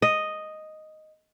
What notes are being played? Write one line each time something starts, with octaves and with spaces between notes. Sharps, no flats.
D#5